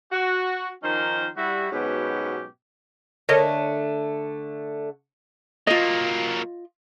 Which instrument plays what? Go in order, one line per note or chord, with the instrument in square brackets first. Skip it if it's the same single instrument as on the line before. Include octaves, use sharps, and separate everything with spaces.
[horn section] F#4
D#3 F3 C#4 D#4 A#4 C5
G3 E4 F#4
G#2 B2 F#3 B3 C#4 G4
[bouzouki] D3 A3 [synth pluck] A#4 C#5 D#5
[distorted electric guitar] F#3 A#3 [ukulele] F4 D#5